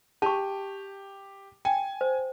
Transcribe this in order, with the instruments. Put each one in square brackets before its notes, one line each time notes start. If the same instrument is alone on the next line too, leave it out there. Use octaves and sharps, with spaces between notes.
[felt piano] G4 [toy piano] A5 C#6
[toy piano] G5 [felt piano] G#5
[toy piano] C5